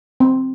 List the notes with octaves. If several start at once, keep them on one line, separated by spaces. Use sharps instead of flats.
C4